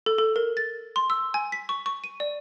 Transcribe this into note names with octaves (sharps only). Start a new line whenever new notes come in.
A4
A4
A#4
A6
C6
E6
G#5
B6
C#6
C#6
D#7
D5